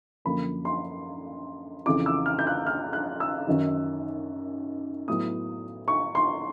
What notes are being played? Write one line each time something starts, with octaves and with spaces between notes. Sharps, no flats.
F#2 D3 F3 A#3 B5
C6
F2 C#3 E3 D6
E6
F6
G6
F#6
F6
F#6
E6
F#2 D#3 F#3
A2 F#3 B3 E4 D#6
C#6
C6